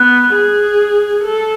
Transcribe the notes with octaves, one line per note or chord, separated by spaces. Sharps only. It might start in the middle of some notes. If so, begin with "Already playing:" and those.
Already playing: B3 F#6
G#4
A4